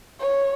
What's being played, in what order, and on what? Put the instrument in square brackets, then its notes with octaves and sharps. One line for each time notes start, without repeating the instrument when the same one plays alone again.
[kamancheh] C#5